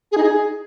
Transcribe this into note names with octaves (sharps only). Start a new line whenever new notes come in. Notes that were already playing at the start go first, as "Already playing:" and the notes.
G#4
D#4
G#4